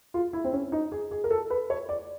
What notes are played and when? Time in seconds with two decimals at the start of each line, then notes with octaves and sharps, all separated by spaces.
0.14 F4
0.33 E4
0.44 C4
0.53 C#4
0.72 D#4
0.92 G#4
1.11 G#4
1.24 A#4
1.31 A4
1.50 B4
1.70 C#5
1.89 D5